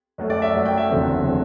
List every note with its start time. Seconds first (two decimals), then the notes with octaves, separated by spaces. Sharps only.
0.18 F#2 F#3 A3
0.30 D5
0.42 E5
0.54 F#2 F#3 A3
0.66 G5
0.77 E5
0.89 F#1 E2 D3 F#3 C4
1.26 D3 F#3 C4